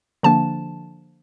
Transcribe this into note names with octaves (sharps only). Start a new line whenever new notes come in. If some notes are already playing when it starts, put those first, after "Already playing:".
D3 F3 A#3 D4 A5